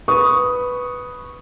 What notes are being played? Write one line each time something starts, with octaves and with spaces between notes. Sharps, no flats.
B4 C#6 D#6